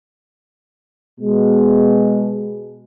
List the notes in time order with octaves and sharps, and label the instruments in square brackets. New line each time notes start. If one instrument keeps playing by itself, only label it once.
[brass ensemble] B2 G#3